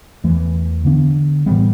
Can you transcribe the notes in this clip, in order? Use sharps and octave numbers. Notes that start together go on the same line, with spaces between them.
E2 E3 A3
D3 B3 D4
A2 E3 G3 B3